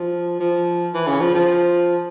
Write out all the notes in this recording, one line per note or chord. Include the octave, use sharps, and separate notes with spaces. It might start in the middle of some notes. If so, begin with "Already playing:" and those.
Already playing: F3
F3
E3
C#3
F3
F3